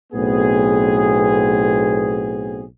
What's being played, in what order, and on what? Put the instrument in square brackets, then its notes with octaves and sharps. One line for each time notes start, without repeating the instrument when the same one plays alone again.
[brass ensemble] B1 A2 B3 C4 G#4